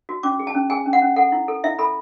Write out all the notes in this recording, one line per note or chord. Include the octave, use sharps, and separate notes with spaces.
F#4
C#4 D6
G#4
A5
C#4
G#4 G#5
C#4
F#5
C#4
A4 F#5
E4
A4
E4 E5
A4 B5